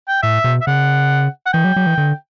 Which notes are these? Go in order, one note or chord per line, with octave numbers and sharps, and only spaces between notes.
G5
A2 E5
B2
E5
C#3 F#5
F#5
E3 G5
F#3
F#3
E3
D3